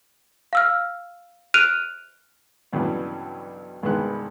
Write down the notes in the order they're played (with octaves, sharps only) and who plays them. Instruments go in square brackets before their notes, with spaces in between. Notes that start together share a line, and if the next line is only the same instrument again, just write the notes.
[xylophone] F5 E6 F6
F6 F#6 D7 D#7 F7
[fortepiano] B1 G2 C#3 E3 F#3
C2 G2 D#3 G#3 B3 F#6